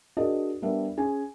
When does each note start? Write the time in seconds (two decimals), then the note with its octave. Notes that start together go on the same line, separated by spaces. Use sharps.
0.17 D4 F#4 G#4 A#4 D#5
0.62 G3 B3 D4 A#4 E5
0.97 C#4 G#4 G#5